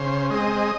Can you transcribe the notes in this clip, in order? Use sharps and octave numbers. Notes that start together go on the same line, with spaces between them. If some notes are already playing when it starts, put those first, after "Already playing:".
Already playing: C#3 C5
G#3 C4 D#5